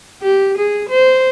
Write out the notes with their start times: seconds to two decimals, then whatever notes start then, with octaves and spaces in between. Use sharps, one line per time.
0.22 G4
0.58 G#4
0.90 C5